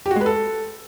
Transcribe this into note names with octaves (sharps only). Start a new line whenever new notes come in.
G4
F#4
G#3
B4
A4